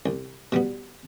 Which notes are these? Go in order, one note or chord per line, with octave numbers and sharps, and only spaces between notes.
C2
B2 G3 B3